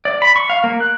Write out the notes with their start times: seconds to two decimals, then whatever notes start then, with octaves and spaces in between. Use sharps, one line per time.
0.05 D5
0.22 B5
0.36 C#6
0.50 F5
0.64 A#3
0.80 F#6